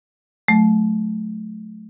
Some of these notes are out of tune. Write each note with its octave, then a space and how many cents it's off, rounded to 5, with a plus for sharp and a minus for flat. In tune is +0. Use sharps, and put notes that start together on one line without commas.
F#3 -30 A3 -20